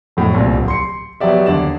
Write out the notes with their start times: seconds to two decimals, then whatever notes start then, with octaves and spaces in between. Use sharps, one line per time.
0.17 F2 A2 F#3
0.34 C2 A#2
0.54 D1
0.68 C6 C#7
1.20 F#3 B3 G4 D5 E5
1.46 D#2 D3 D5 E7